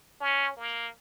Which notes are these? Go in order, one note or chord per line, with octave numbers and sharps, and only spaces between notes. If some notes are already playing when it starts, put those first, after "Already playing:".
C#4
A#3